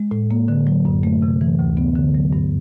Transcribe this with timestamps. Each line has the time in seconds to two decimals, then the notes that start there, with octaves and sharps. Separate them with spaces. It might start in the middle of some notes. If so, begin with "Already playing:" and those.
Already playing: G#3
0.11 A2
0.31 A#3
0.48 D3
0.67 F#3
0.85 F#2
1.03 A3
1.22 C3
1.41 E3
1.59 D2
1.77 B3
1.95 D3
2.15 F#3
2.33 G2